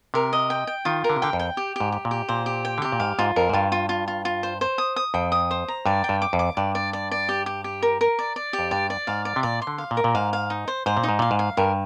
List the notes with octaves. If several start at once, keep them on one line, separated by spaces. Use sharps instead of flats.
C3 A#4
D#5
G5
G5
D#3 F4
A#4
D3
C3
D3 G5
F2
G5
G4
G#2 G4
G4
A#2
G4
A#2 C5
G4
G5
D3
C3 G4
A#2
G#2 F5
G#2 F4
F2 A#4
G#2
G2 F4
F4
F4
F4
F4
C5
C5
D#6
D#6
F2 G5
D#6
C5
A#5
G2 D5
G5
G2
D6
F2
D6
G2 D5
D5
D5
D5
G4
G4
G4
A#4
A#4
D5
D5
G4
F2
G2 D5
D5
G#2 F5
D5
C3
A#2 D5
C6
D3
F5
A#2
A#4
A#2
G#2 F5
F5
D#4
C5
G#2 C5
A#2
D#4
G#2
A#2 F5
G#2
F5
G2 A#4